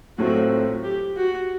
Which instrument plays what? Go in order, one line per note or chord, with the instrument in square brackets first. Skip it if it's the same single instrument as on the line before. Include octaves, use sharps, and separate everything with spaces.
[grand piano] A2 F#3 A3 C4 F4 [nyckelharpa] F#4
[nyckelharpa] G4
F#4